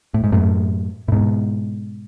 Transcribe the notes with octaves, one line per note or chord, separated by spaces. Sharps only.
A2
G#2
F#2 A2
A2
G#2 B2